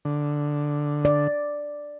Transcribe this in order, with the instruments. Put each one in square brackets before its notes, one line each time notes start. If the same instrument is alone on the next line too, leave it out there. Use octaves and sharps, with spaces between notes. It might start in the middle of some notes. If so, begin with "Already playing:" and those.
[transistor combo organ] D3
[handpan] D5